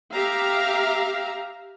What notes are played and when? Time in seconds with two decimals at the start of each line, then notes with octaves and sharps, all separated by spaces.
0.15 G4 E5 F5 A#5